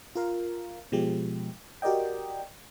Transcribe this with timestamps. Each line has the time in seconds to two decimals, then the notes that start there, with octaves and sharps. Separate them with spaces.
0.15 F4 A#4 F5
0.92 B2 F3 G#3 G4
1.82 F#4 G4 A#4 D5 D#5 G5